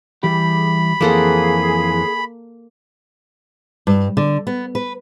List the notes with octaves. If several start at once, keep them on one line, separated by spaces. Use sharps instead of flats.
E3 G3 G4 G#4 B5
F2 E3 A#3 C4 G#4 A4 F#5
G2
D3
B3
B4